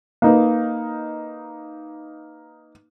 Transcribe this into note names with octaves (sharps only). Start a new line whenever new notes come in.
A#3 D#4 B4